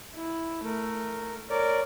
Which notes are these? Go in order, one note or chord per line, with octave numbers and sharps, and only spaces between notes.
E4
A3 A#4
A#4 C#5 D5